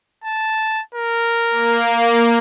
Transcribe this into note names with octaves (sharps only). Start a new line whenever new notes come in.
A5
A#4
A#3